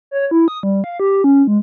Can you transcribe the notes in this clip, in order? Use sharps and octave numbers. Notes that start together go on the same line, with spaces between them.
C#5
E4
D#6
G3
F5
G4
C#4
G#3